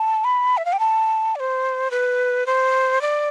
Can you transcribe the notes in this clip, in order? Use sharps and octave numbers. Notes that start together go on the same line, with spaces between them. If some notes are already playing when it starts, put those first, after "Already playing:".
Already playing: A5
B5
E5
F5
G5
A5
D5
C5
B4
C5
D5